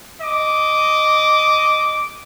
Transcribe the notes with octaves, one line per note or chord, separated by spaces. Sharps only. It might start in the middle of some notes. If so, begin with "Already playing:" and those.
D#5 D6